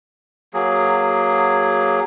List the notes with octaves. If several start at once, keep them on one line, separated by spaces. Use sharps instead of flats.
F#3 A#3 G#4